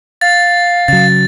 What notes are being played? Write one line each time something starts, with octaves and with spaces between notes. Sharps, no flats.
F5 A6
C#3 F#3 A6